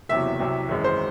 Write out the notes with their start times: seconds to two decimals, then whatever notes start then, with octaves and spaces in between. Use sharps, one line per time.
0.09 F#1 E2 C3 F#3 E5
0.39 C2 C3 F#3
0.69 G#1 F#2 E3 G#3
0.84 C5